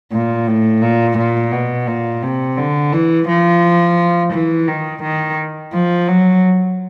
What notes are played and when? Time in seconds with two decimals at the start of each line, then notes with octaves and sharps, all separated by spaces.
0.12 A#2
0.47 A2
0.82 A#2
1.17 A#2
1.52 B2
1.87 A#2
2.22 C3
2.57 D3
2.92 E3
3.28 F3
4.33 E3
4.68 D#3
5.02 D#3
5.73 F3
6.08 F#3